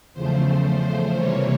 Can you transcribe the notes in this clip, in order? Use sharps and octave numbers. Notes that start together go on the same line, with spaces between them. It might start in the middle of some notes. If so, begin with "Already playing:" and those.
E2 C#3 F3 A3 C5
C5
C3 E3 G3 A#3 C#5